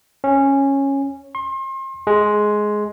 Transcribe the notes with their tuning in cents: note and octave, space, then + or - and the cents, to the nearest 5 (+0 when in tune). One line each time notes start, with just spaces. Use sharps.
C#4 -10
C6 +35
G#3 +10